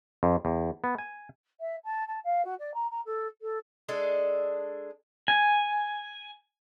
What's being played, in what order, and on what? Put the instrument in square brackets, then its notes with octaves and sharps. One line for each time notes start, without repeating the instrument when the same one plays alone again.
[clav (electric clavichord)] F2
E2
B3
G#5
[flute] E5
A5
A5
F5
F#4
D5
A#5
A#5
A4
A4
[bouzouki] G#3 D4 A4
[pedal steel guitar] G#5